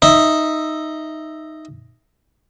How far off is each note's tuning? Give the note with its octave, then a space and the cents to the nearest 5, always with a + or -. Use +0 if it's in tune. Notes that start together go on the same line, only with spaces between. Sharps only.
D#4 +0 E5 +0